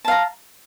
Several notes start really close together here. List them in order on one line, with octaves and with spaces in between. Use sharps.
A5 F5 A#5